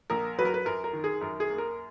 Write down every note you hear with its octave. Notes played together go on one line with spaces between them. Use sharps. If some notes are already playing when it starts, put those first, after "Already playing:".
A#1 A#4
F#3 B4
A#4
B4
F#2 A#4
A#4
D#3
G#4
F#2 A#4
G#4
A#3
A#4